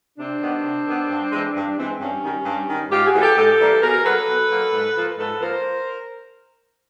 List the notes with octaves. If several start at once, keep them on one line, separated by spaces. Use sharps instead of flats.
C3 C4 D4
D#3 G3 B3
C3
D#3 G3 B3
G2
E3 G#3 C4
G2
E3 G#3 C4
G2 C#4
D#3 G3
G2
D#3 G3
G#2 F4 G4
F#4 G#4
E3 G3 A#3
G4 A4
G#2 G4 A4
E3 G3 A#3
B2 G#4 A#4
F#3 A#3 A4 B4
B2
F#3 A#3
G#2
F3 A#3
G#2 A4 B4
F3 A#3 A#4 C5